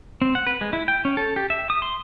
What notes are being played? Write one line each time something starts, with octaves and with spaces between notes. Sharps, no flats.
C4
F#5
B4
G#3
E4
G5
C#4
A4
G4
E5
D#6
C6